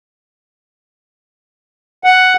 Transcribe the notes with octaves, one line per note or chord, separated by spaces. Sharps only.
F#5